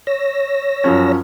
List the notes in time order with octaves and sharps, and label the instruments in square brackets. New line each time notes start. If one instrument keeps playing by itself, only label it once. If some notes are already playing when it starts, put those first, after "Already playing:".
[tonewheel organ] C#5 E6 A#6
[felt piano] F#2 F3 C#4